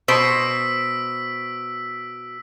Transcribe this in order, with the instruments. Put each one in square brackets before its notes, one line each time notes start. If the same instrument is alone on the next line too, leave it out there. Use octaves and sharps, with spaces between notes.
[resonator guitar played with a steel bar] B2 C5 [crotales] E6 B6 D7